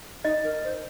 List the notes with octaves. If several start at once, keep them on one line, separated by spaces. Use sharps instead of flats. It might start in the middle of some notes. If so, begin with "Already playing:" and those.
D#4 D#5
A#4
C5